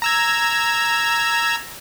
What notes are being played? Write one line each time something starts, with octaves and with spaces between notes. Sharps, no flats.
A#5 E6 G#6